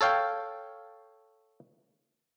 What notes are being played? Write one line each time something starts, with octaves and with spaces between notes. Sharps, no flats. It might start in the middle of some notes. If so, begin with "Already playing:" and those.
A4 C#5 F5 G5